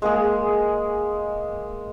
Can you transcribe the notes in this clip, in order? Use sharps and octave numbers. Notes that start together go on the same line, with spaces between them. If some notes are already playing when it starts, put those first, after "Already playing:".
G#3 A#3 G#4